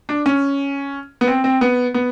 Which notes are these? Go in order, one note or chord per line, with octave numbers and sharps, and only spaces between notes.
D4
C#4
B3
C4
C4
B3
B3